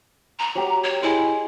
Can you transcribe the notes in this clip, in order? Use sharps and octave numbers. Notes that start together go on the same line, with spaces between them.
A#5
F#3 G4 D6
C#5
E4 G#4 D#5 C6